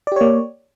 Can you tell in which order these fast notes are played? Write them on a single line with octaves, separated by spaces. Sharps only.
D5 G4 C#5 A#3